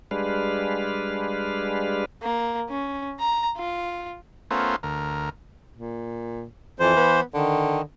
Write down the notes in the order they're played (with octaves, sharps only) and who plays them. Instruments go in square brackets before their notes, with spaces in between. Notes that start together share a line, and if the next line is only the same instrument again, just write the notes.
[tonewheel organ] G3 G#3 D4 B4 F5
[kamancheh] A#3
C#4
A#5
F4
[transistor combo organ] A3 B3 C#4 F4 A#4 C5
D2 A#4
[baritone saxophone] A#2
[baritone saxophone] F2 [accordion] E3 C5
[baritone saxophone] B3
[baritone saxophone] D3 [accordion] D#3